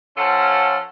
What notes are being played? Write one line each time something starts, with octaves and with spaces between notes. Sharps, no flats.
F3 C#4 F4 A4 F#5 A5